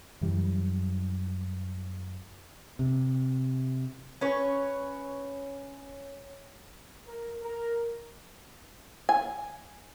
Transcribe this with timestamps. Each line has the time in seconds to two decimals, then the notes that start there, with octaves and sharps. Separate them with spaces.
0.21 F#2 E3 G3
2.79 C3
4.21 C#4 B4 C#5
7.07 A#4
7.40 A#4
9.09 G#5